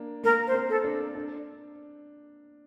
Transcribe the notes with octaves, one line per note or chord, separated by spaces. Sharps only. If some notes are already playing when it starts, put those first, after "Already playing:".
Already playing: A#3 D4
A#3 A#4
C5
C4
A4
D4
D4